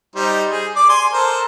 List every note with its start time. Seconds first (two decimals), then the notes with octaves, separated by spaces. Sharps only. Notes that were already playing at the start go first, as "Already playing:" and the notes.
0.16 G3 D#4 C5
0.50 G#4
0.76 D5 D6
0.89 G#5 C6
1.13 A4 A#4 C5